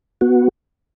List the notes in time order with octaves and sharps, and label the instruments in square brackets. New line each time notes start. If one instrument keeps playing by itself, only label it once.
[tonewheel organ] B3 F#4